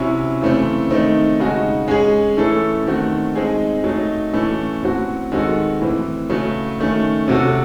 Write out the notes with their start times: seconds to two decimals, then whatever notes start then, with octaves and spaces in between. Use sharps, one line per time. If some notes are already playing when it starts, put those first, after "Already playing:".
Already playing: C3 F#3 C#4 E4
0.41 C#3 E3 A3 C4
0.90 D#3 A3 C4 D#4
1.39 C#3 G#3 D#4 F#4
1.88 G#3 C#4 G#4
2.37 E3 A3 C#4 E4 A4
2.87 D#3 A3 C4 F#4
3.36 G#3 C4 D#4 G#4
3.84 F#3 A3 D#4
4.33 A2 E3 A3 C#4
4.82 A2 F#3 C4 F#4
5.32 D#3 G#3 C4 F#4 A4
5.80 A2 E3 C4
6.29 C#3 F#3 A3
6.79 D#3 A3 C#4
7.28 C3 F#3 C4 F#4 A4